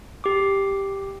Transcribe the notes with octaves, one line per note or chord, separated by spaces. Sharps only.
G4 D6